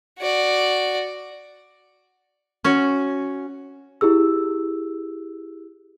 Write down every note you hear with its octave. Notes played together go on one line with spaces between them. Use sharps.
F#4 D5
C#4 F#4
E4 G4 G#4 E6